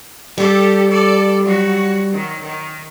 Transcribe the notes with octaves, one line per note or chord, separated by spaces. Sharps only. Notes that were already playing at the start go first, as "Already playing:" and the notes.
G3 G4 A4
A4 D5
F#3 F#4
D#3 F#3
D#3